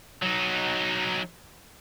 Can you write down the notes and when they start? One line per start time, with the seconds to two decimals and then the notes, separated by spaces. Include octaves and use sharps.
0.22 F#3 D#4